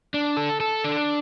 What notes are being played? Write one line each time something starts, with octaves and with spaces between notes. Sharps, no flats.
D4
A4
A4
D4